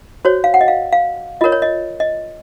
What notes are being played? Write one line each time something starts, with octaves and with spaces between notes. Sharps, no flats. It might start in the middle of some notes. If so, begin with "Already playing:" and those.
F#4 C5 C#5
F5
F#5
D#5
F5
F5
F4 A#4 C#5 D#5
C#5
D#5
D#5